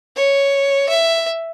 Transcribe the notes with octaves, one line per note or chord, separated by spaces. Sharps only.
C#5
E5